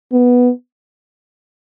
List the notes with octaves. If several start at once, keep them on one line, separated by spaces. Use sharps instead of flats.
B3